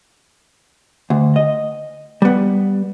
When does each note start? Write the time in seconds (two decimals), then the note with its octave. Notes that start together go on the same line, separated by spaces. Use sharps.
1.10 D2
1.36 D#5
2.22 G3 B3